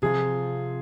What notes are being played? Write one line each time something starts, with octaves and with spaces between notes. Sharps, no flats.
C3 F3 C4 F4 G#4